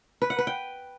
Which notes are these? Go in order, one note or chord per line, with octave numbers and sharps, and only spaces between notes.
B4
F#5
B4
G5